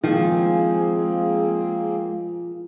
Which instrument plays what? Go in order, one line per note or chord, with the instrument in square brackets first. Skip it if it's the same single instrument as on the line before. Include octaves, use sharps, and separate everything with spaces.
[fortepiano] D#3 [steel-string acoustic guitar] F3 [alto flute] G#3 [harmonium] A#3 C4 G#4